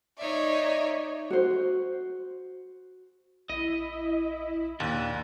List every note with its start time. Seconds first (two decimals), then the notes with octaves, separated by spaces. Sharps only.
0.18 D#4 C#5 D5 E5
1.31 F#4 C5
3.49 A#1 E4 D#5
4.80 D#2 A#2 D4 F#6